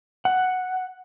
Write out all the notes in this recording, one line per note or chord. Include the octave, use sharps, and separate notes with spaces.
F#5